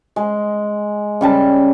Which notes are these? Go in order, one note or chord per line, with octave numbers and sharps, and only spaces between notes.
G#3
C#3 G3 A5